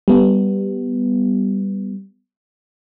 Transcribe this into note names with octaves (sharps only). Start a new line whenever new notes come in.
G3 B3